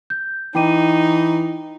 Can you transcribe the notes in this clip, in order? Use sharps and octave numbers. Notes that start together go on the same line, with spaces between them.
G6
E3 D#4 G5 D6 D#7